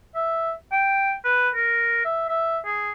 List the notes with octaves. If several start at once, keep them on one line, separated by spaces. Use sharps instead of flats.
E5
G5
B4
A#4
E5
E5
G#4